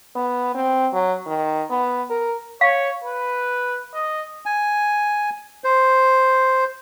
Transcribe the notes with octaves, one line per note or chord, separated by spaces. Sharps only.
B3
C4
F#3
D#3
B3
A#4
C#5 F5
B4
D#5
G#5
C5